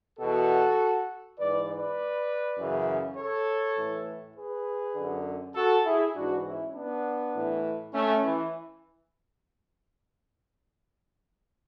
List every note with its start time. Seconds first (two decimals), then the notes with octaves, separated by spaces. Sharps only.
0.19 E2 B2 F#4 A4
1.38 G#2 E3 B4 D5
1.68 B4 D5
2.57 F#2 C#3 E3
3.17 A4 C#5
3.76 A2 E3
4.36 G#4 B4
4.96 F#2 D3
5.55 F#4 A4
5.85 E4 G#4
6.15 G#2 E3 D4 F#4
6.45 C#4 E4
6.75 B3 D4
7.34 A2 E3
7.94 A3 C#4
8.24 E3